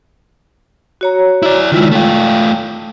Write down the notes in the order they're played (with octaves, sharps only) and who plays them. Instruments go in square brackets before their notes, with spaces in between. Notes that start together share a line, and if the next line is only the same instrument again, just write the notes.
[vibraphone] F#4 C#5 A#5
[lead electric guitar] E4 D5
[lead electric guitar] D#3 E4 [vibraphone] G#3 F4
[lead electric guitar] A3 F4 [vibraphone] G5